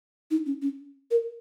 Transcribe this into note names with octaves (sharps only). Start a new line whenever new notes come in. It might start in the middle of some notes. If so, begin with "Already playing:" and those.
D#4
C#4
C#4
A#4